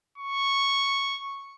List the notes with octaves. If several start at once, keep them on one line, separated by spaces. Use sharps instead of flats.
C#6